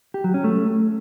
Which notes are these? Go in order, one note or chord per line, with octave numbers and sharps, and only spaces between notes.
G4
F#3
C#4
A3